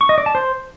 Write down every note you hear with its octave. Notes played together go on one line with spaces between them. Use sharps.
C#6
D#5
D5
A5
C5